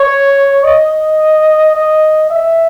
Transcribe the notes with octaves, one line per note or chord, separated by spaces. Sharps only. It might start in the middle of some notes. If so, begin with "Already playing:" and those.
Already playing: C#5
D#5
D#5
E5